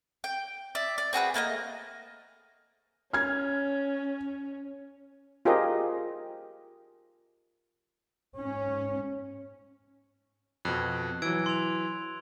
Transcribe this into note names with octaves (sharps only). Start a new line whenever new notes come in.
G5
D5 E5
D5
C4 F#4 G#4 B4
A3 A#3 B4 D#5
C#4 F6 G#6
F4 G4 G#4 A#4 C5 D#5
G#2 C#4
F2 B2 F#6
E3 F#3 E6 G#6 D7
C6 F7